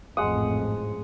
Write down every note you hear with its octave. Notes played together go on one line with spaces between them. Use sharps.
A1 F2 G#2 G#3 F#5 D#6